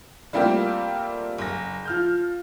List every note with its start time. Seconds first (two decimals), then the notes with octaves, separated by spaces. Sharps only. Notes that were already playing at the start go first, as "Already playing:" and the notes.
0.33 G3 A3 A#3 C4 F4 G4
1.38 F#1 A#6
1.85 F3 F6 G6